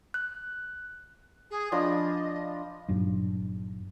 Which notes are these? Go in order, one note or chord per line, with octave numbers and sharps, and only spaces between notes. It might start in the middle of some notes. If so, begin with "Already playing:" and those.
F#6
G#4
F3 D4 D#5 B5
G1 G2 A#2 F#3